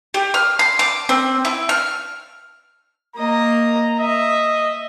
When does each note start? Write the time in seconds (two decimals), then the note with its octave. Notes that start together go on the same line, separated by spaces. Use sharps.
0.14 G4
0.34 F6
0.59 C6
0.79 D6
1.09 C4
1.45 E4
1.69 F6
3.16 A#3 D#5 A#5
4.00 D#5 E5